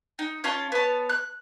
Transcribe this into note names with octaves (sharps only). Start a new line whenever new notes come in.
D#4
C#4 F4 A5
B3 C#5 A5
F#6